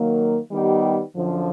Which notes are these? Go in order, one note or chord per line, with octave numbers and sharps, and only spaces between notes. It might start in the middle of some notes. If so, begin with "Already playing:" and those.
Already playing: D#3 F#3 A#3
D#3 G3 B3 D#4 G4
F#2 D3 F3